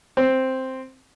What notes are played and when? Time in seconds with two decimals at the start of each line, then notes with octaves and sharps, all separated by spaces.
0.17 C4